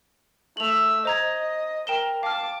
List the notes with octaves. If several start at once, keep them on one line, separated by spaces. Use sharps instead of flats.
A3 E5 F7 F#7
C5 D#5 A#5 G#6
A#4 G5 E7 G7
F5 A5 D6 F6